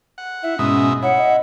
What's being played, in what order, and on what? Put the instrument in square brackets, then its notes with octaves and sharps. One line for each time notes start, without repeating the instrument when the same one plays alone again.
[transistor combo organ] F#5
[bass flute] E4 [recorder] E5
[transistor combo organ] G#2 B2 E5 [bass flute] C#4 [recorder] D#6
[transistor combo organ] E4 [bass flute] C#5 [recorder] F#5
[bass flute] D#5